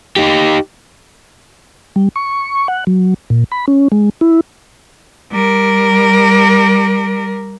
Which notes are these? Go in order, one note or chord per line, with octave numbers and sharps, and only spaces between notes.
D#4 G4
G3
C#6
F#5
F#3
A#2
B5
C#4
G#3
E4
G3 A#4